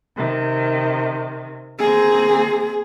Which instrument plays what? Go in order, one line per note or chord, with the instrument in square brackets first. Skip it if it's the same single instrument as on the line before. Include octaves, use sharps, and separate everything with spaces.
[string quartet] C3 D#3
[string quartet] A#3 C4 [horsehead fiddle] G#4